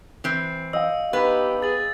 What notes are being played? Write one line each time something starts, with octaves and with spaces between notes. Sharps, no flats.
E3 C4
D#5 F5 G5 E6
B3 D#4 G4 B4
G#4 A6 F#7